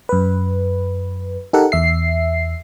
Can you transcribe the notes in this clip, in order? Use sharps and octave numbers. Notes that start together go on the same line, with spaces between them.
F#2 B4
D#4 G4 A4 A#4 F#5
E2 E5 C7